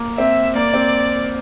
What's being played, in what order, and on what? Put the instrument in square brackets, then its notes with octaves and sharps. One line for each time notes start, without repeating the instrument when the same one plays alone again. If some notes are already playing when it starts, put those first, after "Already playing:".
Already playing: [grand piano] A#3
[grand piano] C4 [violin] E5
[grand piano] A#3 [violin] D5
[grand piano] C4